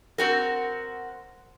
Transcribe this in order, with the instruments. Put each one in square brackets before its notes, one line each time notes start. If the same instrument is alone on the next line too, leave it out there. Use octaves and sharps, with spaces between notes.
[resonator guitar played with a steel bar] C4 F#4 A#4